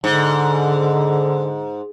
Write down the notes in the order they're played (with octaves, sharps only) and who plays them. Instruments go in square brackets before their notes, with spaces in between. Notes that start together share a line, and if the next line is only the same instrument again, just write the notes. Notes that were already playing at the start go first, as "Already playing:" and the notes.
[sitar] G#2 [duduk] D3